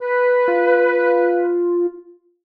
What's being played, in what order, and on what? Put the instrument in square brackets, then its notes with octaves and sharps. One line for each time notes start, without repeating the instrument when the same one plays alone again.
[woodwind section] B4
[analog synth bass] F4